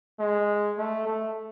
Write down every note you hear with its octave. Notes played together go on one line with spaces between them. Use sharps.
G#3
A3
A3